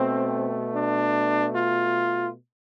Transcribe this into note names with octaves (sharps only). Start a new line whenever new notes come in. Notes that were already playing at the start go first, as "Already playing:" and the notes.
Already playing: B2 A3 C4
D4
F4